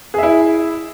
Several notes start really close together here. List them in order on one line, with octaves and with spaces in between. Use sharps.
G#4 E5 E4